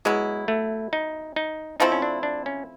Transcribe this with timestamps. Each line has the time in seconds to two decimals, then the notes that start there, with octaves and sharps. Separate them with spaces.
0.05 F#3 G#3 B3 E4
0.48 A3
0.93 D#4
1.36 D#4
1.80 F3 A3 C4 D#4 E4
1.92 C#4
2.02 D4
2.23 D4
2.46 C#4